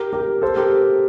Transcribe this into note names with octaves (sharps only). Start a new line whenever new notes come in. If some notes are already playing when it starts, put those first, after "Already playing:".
Already playing: G4 A#4
G4 A#4
A4 C5
G4 A#4